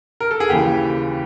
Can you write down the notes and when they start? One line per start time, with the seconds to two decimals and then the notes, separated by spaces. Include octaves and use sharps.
0.20 A#4
0.31 A4
0.40 G#4
0.50 D#2 C#3 E3 G4